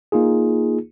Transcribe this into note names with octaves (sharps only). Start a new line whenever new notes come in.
A#3 D#4 F4 G#4